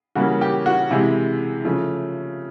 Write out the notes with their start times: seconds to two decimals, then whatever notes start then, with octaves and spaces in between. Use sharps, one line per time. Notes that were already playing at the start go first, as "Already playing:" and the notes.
0.15 C#3 E3 G3 A#3 F#4
0.41 G4
0.66 F#4
0.91 C3 E3 G#3 E4
1.65 C#3 F3 A3